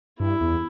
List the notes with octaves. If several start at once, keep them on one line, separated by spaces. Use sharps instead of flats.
G2 E4
E2